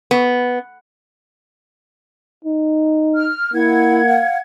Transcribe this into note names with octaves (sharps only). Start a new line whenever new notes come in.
B3
D#4
F6
A#3 E4 F#5 G#6
F5